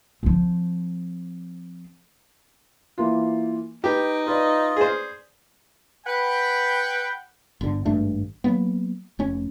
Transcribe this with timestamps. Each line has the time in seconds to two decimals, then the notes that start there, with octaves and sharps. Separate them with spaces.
0.23 F3 C4
2.98 E3 A#3 F4
3.84 D#4 G4 B4 G5
4.27 F4 B4 D5 D#5
4.77 G#4 C5
6.06 B4 F#5 G5
7.61 G1 D3
7.85 G#1 G2 A3 D4
8.44 F#3 A#3 B3
9.19 F1 C#4